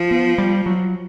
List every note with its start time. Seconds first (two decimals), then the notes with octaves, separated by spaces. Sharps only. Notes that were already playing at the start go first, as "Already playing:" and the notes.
Already playing: F3
0.11 B3
0.38 G3
0.66 F#3